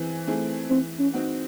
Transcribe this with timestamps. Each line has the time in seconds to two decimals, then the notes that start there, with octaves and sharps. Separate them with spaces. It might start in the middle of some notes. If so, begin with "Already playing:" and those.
Already playing: E3 C4 G#4
0.27 A3 C4 E4 G#4
0.70 E3 C4
0.99 C#4
1.14 C4 D#4 F#4